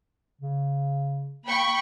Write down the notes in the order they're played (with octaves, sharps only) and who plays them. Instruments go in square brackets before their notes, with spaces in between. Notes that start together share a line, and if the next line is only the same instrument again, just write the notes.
[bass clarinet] C#3
[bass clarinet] A#3 [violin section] G5 B5 C#6